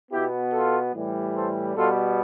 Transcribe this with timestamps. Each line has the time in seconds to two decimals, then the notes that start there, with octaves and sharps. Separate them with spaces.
0.11 B2 B3 E4 G4
0.52 F4 A4
0.93 A2 E3 G3
1.35 A4 C5
1.75 B2 G3 B3 F4 A4